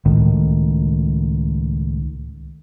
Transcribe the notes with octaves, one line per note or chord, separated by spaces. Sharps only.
C#2 A2 D#3